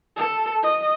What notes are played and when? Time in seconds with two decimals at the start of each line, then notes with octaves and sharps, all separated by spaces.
0.16 A4
0.63 D#5